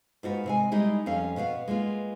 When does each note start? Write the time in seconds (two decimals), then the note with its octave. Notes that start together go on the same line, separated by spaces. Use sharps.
0.23 G#2 F4 F#4 B4
0.46 C3 G#3 G#5
0.72 G3 G#3 D#4 E4
1.06 F2 C#4 F5
1.36 B2 B3 F#4 F5
1.68 G#3 A#3 B3 F4